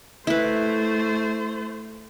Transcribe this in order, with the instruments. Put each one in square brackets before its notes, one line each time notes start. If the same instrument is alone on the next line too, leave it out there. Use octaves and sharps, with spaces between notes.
[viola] A3 C5 [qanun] E4 B4